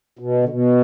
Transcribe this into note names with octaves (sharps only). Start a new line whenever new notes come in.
B2
D3
B2